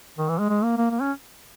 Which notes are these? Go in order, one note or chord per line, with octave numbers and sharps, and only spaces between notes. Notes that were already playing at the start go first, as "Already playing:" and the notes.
D#3
E3
G#3
G#3
A#3
A#3
A#3
C#4